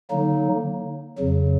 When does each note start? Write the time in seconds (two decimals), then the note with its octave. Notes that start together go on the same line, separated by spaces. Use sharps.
0.10 D3 F#3 A#3 D#4
1.19 F2 C#3 F#3